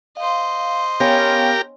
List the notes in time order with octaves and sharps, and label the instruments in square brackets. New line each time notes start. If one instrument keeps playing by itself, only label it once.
[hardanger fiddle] C5 D#5 [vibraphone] F5
[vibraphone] B3 F5 G5 [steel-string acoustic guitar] C#4 [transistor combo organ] G4 A#4